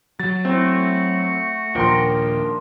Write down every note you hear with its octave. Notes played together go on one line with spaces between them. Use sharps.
F#3 A6
A3 C4 E4 F#4
D#2 A#2 F3 D4 A#4 G5 C6